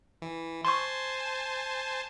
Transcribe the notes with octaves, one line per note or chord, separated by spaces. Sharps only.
E3
C5 G#5 A5 C6 C#6